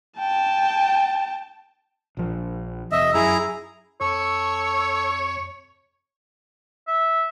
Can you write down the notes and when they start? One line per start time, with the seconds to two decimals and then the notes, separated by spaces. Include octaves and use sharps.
0.19 G5 A5
2.17 A#1 F3
2.92 F1 F2 D#5 E5
3.14 F#2 E4 G#4 A#5
4.01 F2 A4 C#5 C#6 E6
6.87 E5